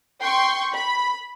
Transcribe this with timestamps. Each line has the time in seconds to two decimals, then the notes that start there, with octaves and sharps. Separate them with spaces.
0.21 G5 C6 C#6
0.73 B5